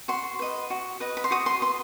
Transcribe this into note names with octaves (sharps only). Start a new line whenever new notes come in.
F#4 C6
B4 D#5
F#4
B4 D#5
B5
C6
F#4 D#6
C6
B4 D#5 C6